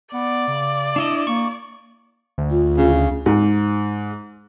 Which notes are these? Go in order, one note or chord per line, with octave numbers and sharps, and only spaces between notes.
B3 D5
C#3
D4 E4 D#5
A#3 C#6
D2
F4
C#3
G#2